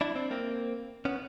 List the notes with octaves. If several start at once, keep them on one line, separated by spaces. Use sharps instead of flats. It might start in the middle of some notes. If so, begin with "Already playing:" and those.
D4 E4
C4 D4
A#3 C4
B3 C#4